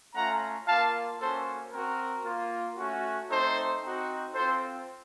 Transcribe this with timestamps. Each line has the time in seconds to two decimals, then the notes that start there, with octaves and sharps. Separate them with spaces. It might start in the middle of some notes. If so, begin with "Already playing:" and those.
0.14 A3 C#4 F4 F#5 A#5
0.67 A#3 F4 F5 A5
1.19 A#3 C#4 F#4 A4 C5
1.72 C4 F#4 A#4
2.25 A#3 F4
2.77 A3 C#4 F#4
3.30 A3 C4 D#4 A4 C5
3.82 C4 D#4 F#4
4.34 C4 F4 A4 C5